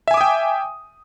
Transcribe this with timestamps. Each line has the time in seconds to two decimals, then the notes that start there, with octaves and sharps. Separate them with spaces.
0.08 E5
0.11 G#5
0.14 D6
0.17 D#6
0.21 G5